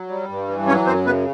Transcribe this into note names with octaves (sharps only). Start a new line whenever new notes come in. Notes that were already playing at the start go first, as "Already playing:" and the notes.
Already playing: F#3
G3
G2
E3
F#3 C#4 C#5
F#2 C4 C5
C#3 B3 B4